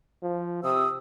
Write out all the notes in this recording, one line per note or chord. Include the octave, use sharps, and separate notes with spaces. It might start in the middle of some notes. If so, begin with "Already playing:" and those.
F3
C3 D#6 E6